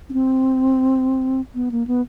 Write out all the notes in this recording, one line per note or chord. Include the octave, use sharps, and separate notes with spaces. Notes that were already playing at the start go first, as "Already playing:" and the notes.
C#4
C4
B3
A#3
B3